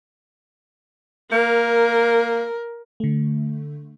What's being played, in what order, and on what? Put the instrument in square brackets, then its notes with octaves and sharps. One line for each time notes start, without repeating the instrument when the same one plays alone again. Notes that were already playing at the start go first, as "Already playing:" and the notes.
[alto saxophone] A#3 [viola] A#4
[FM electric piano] D3 A3